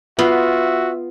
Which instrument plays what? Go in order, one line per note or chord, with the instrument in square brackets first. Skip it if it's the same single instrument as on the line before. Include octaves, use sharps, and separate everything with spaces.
[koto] B3 [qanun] F4 [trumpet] F#4 [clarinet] E5